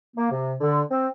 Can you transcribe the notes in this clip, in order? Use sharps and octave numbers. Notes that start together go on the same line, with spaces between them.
A#3
C3
D3
C4